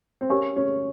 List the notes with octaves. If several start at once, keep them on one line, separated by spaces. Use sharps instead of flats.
C4
C#4 G4 A#4 F5 G#5
C#4